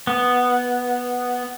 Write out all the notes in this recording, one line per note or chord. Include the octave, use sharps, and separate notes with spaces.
B3